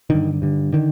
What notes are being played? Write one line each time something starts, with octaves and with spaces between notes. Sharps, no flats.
G2 D3 D#3
G2 D3
D3 D#3